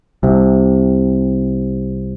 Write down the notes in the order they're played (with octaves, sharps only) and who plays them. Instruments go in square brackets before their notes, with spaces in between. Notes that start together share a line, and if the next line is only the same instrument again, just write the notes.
[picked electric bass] C2 C3